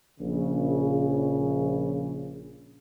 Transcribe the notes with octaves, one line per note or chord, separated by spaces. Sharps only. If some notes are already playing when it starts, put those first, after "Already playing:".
A#1 C#3